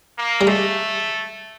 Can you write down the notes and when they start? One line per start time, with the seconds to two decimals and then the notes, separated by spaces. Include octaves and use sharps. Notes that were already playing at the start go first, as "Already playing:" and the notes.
0.18 A#3
0.41 G3
0.47 G#3 A3